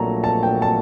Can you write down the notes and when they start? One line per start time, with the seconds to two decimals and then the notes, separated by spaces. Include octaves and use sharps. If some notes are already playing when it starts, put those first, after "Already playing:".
Already playing: A#1 A#2 F#3 A3 A5 A#5
0.24 A5
0.43 G5
0.62 A5